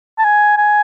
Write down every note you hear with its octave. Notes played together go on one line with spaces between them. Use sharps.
A5
G#5
G#5